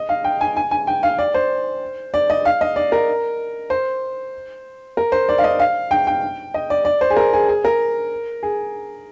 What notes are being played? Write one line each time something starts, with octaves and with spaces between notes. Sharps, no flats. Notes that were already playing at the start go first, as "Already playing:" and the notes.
Already playing: D#5
F5
G5
G#5
G#5
G#5
G5
F5
D5
C5
D5
D#5
F5
D#5
D5
A#4
C5
A#4
C5
D5
F5
D#5
F5
G5
G5
D#5
D5
D5
C5
G#4
A#4
G#4
G#4
A#4
G#4